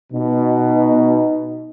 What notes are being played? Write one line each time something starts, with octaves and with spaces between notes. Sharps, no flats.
B2 D#4